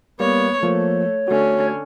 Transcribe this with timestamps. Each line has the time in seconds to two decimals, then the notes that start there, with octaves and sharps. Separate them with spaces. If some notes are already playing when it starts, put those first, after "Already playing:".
0.20 G3 A#3 B3 C#5
0.63 F3 A3 A#3 C#5
1.28 D3 A3 C#4 F#4